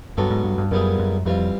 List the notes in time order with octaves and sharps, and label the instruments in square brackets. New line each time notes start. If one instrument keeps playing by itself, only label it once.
[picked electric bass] G2 [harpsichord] F#3 B3 D4 F#4 A4
[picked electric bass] G#2
G2
G2
[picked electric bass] F#2 [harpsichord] A#2 G3 B3 E4 G#4
[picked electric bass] F#2
[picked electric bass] F2 [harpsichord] E3 G3 C4 F4